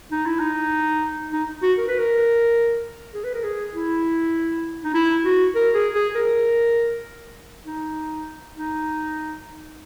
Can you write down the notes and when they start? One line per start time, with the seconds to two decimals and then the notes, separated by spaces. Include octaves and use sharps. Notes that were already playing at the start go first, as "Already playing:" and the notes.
0.12 D#4
0.26 E4
0.39 D#4
1.33 D#4
1.63 F#4
1.78 A#4
1.88 B4
1.99 A#4
3.14 G#4
3.24 B4
3.34 A#4
3.44 G#4
3.73 E4
4.84 D#4
4.94 E4
5.24 F#4
5.55 A#4
5.74 G#4
5.95 G#4
6.15 A#4
7.66 D#4
8.56 D#4